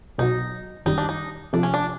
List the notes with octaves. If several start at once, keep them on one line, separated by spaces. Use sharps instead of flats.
B1 B2 F#3 D#4
G1 F#2 D#3 G3 D#4
D4
D#4
C3 F3 A3 D4
C#4
D4